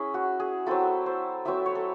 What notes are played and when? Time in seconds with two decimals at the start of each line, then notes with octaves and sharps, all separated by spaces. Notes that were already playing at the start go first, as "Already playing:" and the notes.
Already playing: C#4 E4 G#4
0.14 F#4
0.40 G#4
0.66 F#3 C4 E4 A4
1.06 C5
1.45 F#3 C4 E4 E5
1.66 C#5
1.75 A4